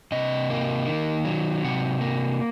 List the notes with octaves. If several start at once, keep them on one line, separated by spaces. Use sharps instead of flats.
C3 D#5
A#3
D#3
F#3
C3 F#5
A#3